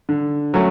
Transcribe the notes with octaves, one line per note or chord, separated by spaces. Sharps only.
D3
F#3 A3 C#4